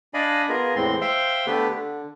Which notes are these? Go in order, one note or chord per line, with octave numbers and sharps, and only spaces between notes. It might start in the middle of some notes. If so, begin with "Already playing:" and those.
D4 D5 D#5 F5 G#5 B5
B3 F4 G#4 A#4
E2 A2 G#3 C4 C6
C5 E5 F5 G5 C6
D3 A3 B3 G4 B4
D3